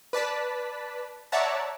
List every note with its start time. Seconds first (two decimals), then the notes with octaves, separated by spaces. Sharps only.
0.13 B4 D5 A5 B6
1.32 C#5 D5 E5 F#5 A5 A#5